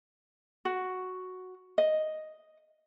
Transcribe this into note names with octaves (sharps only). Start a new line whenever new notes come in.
F#4
D#5